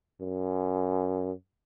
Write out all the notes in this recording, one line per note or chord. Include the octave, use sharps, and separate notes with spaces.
F#2